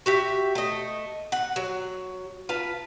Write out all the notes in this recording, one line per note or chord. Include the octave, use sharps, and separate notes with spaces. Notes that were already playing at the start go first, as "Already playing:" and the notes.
F#4 G4 E5
A3 D#5
F#5
F#3
F4 B4 A5